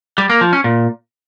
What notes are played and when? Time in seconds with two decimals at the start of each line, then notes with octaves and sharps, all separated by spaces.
0.18 G3
0.30 A#3
0.41 F3
0.53 C#4
0.64 A#2